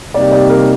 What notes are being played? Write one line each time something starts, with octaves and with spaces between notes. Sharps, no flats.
C3 G3 A#3 D#4 G4 D5
D5
A#4